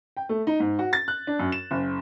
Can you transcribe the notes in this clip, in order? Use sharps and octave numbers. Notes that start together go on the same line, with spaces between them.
G5
A3
D#4
G#2
F#4
A6
F#6
D4
F#2
E7
F#1